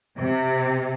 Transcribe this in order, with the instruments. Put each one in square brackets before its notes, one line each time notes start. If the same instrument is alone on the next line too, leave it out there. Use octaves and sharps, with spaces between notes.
[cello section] C3